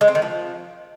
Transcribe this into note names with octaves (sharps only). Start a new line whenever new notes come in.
G#3
C4
D#3
F3